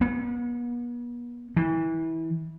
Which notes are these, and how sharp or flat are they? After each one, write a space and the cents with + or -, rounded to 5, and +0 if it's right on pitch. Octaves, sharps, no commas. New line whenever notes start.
B3 -40
E3 -25